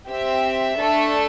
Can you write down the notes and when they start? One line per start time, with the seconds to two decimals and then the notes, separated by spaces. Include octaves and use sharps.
0.08 C4 G4 E5
0.78 A3 D4 A4